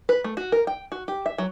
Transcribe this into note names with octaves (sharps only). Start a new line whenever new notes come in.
B4
A3
F#4
A#4
G5
F#4
G4
E5
F#3